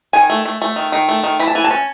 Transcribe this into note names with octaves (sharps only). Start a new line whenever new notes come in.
D#3 G#5
A3
A3
A3
D#3
D#3
A3
D#3
E3 B5
A5
E3 G#5
A5
C#4